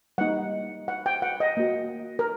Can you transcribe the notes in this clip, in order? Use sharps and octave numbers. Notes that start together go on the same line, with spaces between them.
G3 A#3 D#4 F#5
F#5
G5
F#5
D#5
A#3 F#4
A#4